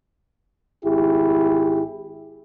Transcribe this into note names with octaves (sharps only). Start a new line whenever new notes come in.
G#1 E4 G4 G#4